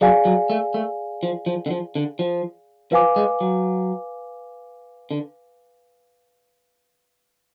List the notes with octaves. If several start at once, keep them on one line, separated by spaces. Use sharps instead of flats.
F#3 G#4 D5 F5 G#5
F#3
A3
A3
F3
F3
D3
F3
D3
F3
F3 B4 F5 G#5 D6
G#3
F#3
D3